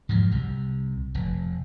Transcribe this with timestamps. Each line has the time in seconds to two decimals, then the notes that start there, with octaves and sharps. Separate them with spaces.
0.09 G#2 F3 F#3
0.32 C2 C3
1.15 F1